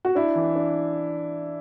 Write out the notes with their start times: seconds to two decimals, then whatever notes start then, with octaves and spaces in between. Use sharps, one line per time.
0.05 F#4
0.15 D4 E4
0.36 E3
0.56 D4